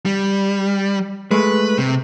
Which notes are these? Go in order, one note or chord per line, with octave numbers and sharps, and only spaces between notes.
G3
G#3 A3 B4
C3